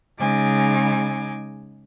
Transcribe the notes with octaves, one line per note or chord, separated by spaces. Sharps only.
C#3 G#3 D#4 G#5 D6